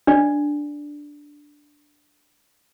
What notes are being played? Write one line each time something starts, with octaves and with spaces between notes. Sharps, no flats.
D4 D5